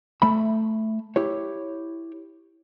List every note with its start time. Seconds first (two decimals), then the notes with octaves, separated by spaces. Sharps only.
0.22 A3 E5 B5
1.16 E4 G4 C#5